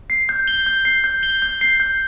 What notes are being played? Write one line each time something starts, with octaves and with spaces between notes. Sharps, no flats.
C7
G6
G7
G6
C7
G6
G7
G6
C7
G6